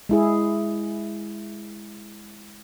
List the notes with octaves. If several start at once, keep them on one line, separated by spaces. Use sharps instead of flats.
G#3 E4 G#4